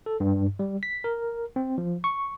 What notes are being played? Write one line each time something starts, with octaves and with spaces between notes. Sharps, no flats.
A4
G2
G3
B6
A#4
C4
F3
C#6